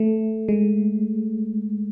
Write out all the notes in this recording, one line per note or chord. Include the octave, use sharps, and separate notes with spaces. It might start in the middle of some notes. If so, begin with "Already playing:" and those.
Already playing: A3
G#3